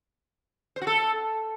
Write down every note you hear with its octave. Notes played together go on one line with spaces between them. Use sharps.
C5
F#4
A4